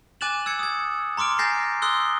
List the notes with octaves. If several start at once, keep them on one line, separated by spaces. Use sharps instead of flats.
G#5 D6 F#6 A6 E7 F#7
E6 G#6 C#7
D#6 G#6
A#5 C6 D6 F6 D7
G#5 G6 A6 A#6 C7
C6 D#6 E6 F#6 G7